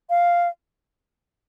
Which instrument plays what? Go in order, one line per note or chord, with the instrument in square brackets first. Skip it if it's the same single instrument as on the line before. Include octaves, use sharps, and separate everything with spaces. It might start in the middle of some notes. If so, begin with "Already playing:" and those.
[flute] F5